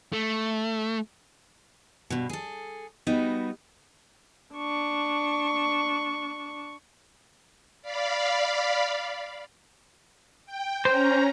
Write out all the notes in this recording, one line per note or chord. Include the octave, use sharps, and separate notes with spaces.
A3
G2 B2
G#4 A4
G3 B3 D#4 F#4
D4 C#6
D5 F5 B5
G5
C#4 C5 A#5